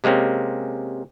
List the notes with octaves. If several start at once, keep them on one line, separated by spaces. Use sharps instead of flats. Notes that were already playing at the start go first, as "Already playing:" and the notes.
C3 G#3 A#3 C4 C#4